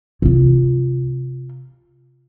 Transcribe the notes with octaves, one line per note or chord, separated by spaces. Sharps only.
C3 F4